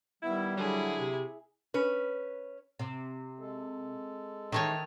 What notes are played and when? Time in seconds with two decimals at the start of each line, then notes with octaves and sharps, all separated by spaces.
0.23 D#3 G3 B3 E4
0.57 D3 F#3 E4 G#4
0.98 C3
1.74 C#4 B4
2.79 C3
3.40 G#3 A4
4.52 D#3 E3 A3 D#4 C#5